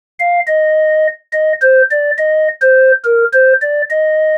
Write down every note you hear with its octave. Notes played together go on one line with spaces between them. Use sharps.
F5
D#5
D#5
C5
D5
D#5
C5
A#4
C5
D5
D#5